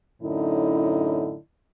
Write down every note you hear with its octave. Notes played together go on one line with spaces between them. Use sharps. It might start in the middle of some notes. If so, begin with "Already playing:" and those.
F#2 A2 D3 D#4 E4